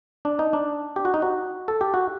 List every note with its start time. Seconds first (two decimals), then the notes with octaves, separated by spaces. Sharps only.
0.25 D4
0.39 D#4
0.53 D4
0.96 G4
1.05 F#4
1.14 D#4
1.22 F#4
1.68 A4
1.81 G4
1.94 F#4